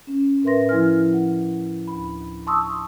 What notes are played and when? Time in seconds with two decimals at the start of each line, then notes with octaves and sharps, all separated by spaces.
0.07 C#4
0.43 A2 A#4 B4 E5 C6 A#6
0.69 F3 E4 G#5 F6
1.13 F#5
1.88 D2 B5
2.47 A5 C6 C#6 D#6 E6